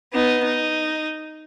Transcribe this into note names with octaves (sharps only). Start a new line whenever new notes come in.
B3 D#4
D#4